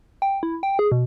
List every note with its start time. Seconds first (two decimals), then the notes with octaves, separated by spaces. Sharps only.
0.22 G5
0.43 E4
0.63 G5
0.79 G#4
0.92 B2